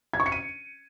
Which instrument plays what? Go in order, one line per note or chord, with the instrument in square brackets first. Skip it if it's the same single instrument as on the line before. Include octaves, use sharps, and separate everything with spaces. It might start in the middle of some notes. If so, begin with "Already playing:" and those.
[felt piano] G#6
C#6
C#7
D#7